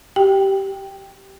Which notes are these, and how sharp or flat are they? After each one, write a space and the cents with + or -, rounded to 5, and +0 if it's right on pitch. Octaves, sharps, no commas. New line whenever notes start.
G4 -15 G5 +0